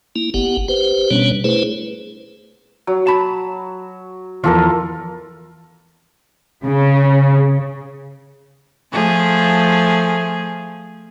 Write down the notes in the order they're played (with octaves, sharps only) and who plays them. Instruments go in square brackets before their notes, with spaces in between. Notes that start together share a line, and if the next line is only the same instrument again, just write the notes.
[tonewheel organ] A#3 E4
G1 B3 G4 F#5
G4 B4 C5
B2 G3 B3 C#4 D4 C#5
A3 E4 G#4 B4 C5
[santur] F#3
[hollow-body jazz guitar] A5 B5
[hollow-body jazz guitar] E2 E3 F3 [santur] F4 A4 A#4
[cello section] C#3
[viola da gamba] F3 A3 G#4